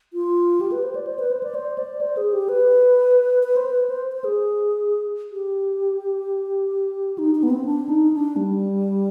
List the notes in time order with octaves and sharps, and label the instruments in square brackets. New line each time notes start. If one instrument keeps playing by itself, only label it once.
[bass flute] F4
G4
B4
C5
D5
C5
B4
C5
D5
C5
D5
C5
G#4
G4
B4
B4
C5
B4
C5
C5
G#4
G4
D#4
D#4
B3
C4
D4
D#4
D4
G3